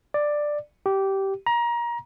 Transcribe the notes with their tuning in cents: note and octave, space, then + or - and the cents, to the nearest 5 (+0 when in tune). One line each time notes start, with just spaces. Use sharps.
D5 +10
G4 -15
A#5 +25